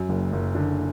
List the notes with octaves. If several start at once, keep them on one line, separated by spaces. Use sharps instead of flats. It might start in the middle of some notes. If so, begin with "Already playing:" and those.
Already playing: F#2
F#1
F#1
D3